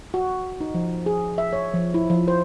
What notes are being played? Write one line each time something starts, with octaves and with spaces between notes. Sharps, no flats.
F#4
D#4
F3
G#4
E5
C#5
F3
E4
F3
C5